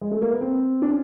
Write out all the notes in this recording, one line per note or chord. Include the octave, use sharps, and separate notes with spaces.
G#3
A3
A#3
B3
C4
D4
C#4